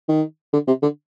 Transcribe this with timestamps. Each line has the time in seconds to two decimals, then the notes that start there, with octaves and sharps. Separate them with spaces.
0.09 D#3
0.53 D3
0.67 C3
0.82 D3